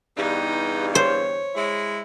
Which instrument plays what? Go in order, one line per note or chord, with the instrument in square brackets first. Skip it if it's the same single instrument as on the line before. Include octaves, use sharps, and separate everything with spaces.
[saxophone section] E2 G2 [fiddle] D#4
[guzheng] C5 [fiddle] C#5
[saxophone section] G#3 E4